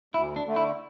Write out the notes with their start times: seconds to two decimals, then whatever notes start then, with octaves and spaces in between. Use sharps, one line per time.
0.14 D2 E4
0.36 D4
0.46 D3 A3
0.56 E4